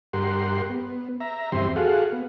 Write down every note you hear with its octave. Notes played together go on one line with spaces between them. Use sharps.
G2 G4 A#4 F#5 C6
B3
E5 A#5
E2 G2 C4 G4 E5 C6
F#4 G#4 A4 F5 F#5
B3